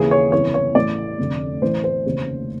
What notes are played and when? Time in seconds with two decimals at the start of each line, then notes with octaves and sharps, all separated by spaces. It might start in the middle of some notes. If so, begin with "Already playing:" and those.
Already playing: D#2 C#3 E3 G#4
0.11 C#5
0.32 G1 F2 C#3 E3 C#5
0.54 C#5
0.75 A1 A2 E3 D5
1.19 F1 F2 D3
1.62 A1 A2 E3 C5
1.84 C5
2.06 F1 D#2 C#3 E3